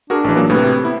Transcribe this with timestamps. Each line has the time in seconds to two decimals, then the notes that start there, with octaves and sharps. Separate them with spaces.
0.10 D4 F#4 G#4 A#4
0.24 A1 E3
0.36 F#3 A#3
0.50 A2 C3 B4
0.85 B3 E4